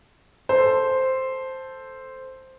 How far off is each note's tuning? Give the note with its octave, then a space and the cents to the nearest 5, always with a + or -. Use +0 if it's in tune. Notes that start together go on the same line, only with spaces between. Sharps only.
A4 +0 C5 +0